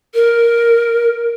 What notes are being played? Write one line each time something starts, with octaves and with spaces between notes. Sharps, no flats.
A#4